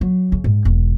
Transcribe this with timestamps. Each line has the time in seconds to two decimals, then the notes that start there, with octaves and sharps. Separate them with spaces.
0.01 F#3
0.32 C#3
0.44 G#2
0.65 E1